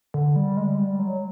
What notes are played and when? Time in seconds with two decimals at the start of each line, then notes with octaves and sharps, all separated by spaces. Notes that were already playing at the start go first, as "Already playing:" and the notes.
0.14 D3
0.36 G3
0.57 G#3
0.78 G3
0.99 F#3